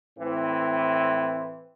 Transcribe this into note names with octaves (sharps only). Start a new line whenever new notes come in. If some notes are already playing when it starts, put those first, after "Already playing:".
A2 E3 C4